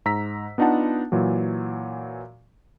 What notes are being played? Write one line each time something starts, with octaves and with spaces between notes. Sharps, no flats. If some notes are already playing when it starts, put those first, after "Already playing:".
G#2 A#5 E6 B6
B3 D4 D#4 F4 F#5 A5
A#2 E3 F#3